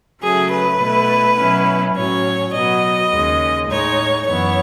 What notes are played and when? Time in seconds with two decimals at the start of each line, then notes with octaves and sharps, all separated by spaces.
0.22 C#3 F#3 A3 G#4
0.51 B4
0.80 B2 A3 E4
1.38 B2 F#3 C#4 E4
1.95 A2 F#3 C#4 C#5
2.54 B2 F#3 B3 D#5
3.11 D#2 C#3 G#3
3.69 A2 G#3 D#4 C#5
4.27 F#2 E3 B3 C#5